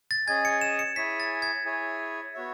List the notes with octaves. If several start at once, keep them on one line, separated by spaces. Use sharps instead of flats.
A6
C#4 G#4 D#5 G#5 G#6
C#7
E7
C#7
E4 G#4 C#5 G#5 B6
A6
G#6
E4 G#4 C#5 G#5
B3 F#4 C#5 E5